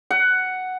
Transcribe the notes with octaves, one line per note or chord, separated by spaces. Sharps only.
F#5